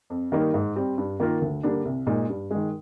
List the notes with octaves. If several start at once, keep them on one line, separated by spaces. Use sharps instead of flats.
F2
D#3 G3 A#3 D#4
G#2
G3 C4
G2
D#3 A#3 F4 A#4
D2
D3 G3 A#3 D4
C2
A#2 G#3 D#4
G2
D#3 G#3